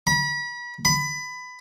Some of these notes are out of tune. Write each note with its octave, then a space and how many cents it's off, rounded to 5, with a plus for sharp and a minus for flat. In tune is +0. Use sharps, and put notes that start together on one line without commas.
B5 -35
B5 +20